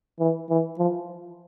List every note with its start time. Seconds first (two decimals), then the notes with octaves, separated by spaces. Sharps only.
0.19 E3
0.50 E3
0.78 F3